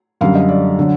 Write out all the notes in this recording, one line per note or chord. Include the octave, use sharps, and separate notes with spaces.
F#2 D3 G3 F5
D#5
D5
D3 F#3